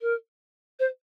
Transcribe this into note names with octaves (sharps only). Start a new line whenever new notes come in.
A#4
C5